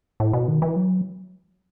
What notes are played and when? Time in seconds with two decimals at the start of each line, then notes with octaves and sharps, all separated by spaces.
0.20 A2
0.33 B2
0.48 D#3
0.62 E3
0.76 F#3